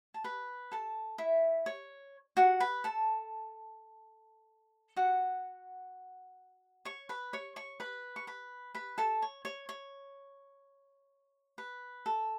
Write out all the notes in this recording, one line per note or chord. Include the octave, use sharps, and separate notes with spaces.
A5
B4 B5
A4 A5
E4 E5
C#5
F#4 F#5
B4 B5
A4 A5
F#4 F#5
C#5 C#6
B4 B5
C#5 C#6
C#5 C#6
B4 B5
C#6
B4 B5
B4 B5
A4 A5
C#5
C#5
C#5
B4
A4